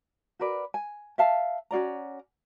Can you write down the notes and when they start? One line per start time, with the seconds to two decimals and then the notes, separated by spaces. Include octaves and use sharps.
0.39 F#4 A#4 B4 D5
0.74 G#5
1.18 E5 F5 A5
1.71 C#4 F#4 D5 A#5